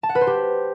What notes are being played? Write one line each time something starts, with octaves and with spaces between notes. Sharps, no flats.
A5
F#5
B4
C5
G4